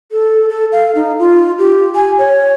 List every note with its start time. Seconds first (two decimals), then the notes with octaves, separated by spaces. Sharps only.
0.12 A4
0.49 A4
0.72 F5
0.95 D#4
1.19 F4
1.59 G4
1.95 G#5
2.19 C#5